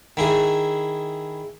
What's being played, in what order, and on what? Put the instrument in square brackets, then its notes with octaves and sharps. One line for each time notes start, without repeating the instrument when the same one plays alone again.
[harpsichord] D#3 E4 G#4